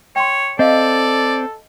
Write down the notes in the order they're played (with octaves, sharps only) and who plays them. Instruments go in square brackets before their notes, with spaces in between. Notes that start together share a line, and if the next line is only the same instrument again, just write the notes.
[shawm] C#5 [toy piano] G5 C6
[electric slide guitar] C4 [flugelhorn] A4 [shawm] D5 [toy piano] D#5 F5